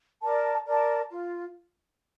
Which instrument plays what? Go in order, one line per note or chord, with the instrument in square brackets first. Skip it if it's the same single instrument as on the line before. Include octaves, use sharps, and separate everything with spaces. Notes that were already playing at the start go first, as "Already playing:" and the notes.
[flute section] A#4 D5 A5
A#4 D5 A5
F4